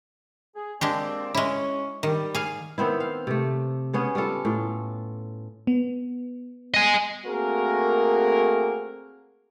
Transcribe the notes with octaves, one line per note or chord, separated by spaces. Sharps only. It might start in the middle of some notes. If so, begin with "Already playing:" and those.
G#4
G#3 A#3 C4 D4 G4 D5
G#3 C#4 E4
D#3 G3
G#4 F5
D#3 B3 C4 E4
F5
C3 A3
C#3 B3 C#4 G#4
G3 C#4 F4 A4
A2 F4
B3
D#5 G#5
A3 A#3 C4 F#4 G#4 A#4